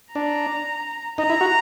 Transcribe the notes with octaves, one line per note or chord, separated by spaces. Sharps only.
D4 A#5
D#4 A#5
E4
F#4